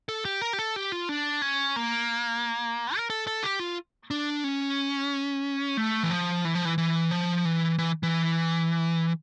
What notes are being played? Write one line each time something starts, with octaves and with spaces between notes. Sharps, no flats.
A4
G4
A#4
G4
A4
G4
F4
D4
C#4
A#3
A#4
A4
A4
G4
F4
D4
C#4
A3
E3
F3
E3
F3
E3
E3
F3
E3
E3
E3